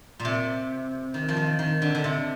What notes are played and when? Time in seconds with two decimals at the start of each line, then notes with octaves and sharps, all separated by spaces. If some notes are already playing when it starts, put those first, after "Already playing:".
0.20 A#2
0.25 C3
1.14 D#3
1.29 F3
1.37 D#3
1.59 D#3
1.82 D3
1.95 D3
2.04 C3